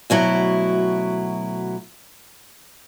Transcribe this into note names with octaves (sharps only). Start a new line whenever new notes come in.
D2 B2 F#3 E4